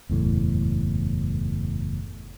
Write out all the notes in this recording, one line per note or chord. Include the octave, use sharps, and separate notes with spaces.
F#1 E2 A2